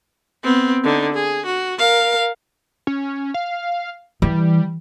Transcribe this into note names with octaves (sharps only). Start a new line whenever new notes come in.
B3 C4
D3 D#4
G#4
F#4
A#4 F5
C#4
F5
E3 G3